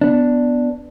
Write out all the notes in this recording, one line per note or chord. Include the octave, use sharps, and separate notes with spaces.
B3 D4